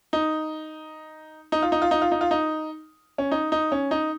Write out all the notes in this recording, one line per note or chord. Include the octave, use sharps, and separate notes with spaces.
D#4
D#4
F4
D#4
F4
D#4
F4
D#4
F4
D#4
C#4
D#4
D#4
C#4
D#4